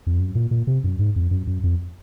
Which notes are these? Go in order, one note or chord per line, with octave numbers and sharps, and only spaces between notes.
F2
F#2
A#2
A#2
C3
F#2
G#2
F2
F#2
F#2
F2